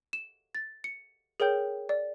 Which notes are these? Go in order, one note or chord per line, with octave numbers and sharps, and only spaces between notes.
E7
A6
C#7
G#4 A#4 C#5 G5 G6
D5